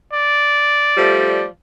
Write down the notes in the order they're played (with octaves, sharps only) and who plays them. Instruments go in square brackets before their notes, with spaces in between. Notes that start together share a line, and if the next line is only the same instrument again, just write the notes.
[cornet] D5
[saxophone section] F3 G3 A3